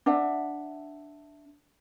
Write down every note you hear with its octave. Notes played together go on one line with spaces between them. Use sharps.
D4 E5 F#5